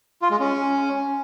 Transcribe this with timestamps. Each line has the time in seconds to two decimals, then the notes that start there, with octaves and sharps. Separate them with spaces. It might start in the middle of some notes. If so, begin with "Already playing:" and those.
0.22 F4
0.31 G#3
0.40 C#4